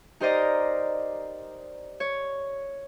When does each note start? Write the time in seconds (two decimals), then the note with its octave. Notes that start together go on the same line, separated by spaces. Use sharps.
0.20 D#4 G4 A#4 C5 D5 D#5
2.00 C#5